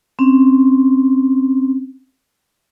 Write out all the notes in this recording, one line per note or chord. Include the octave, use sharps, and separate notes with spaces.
C4 C#4